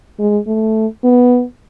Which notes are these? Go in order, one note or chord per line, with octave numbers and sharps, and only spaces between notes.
G#3
A3
B3